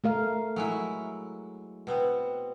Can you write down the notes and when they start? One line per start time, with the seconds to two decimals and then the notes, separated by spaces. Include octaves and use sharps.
0.04 A3 A#4 F5
0.56 F#3 G#3 E4
1.87 B2 B3 C4